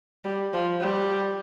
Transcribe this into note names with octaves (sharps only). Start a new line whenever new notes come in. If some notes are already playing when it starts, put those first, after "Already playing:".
G3
F3
G3